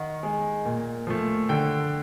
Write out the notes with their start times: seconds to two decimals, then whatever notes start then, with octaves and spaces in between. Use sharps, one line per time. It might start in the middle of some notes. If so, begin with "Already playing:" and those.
Already playing: D#3 F#5
0.23 G#3
0.65 A#2
1.07 F3 A3
1.49 D3 G5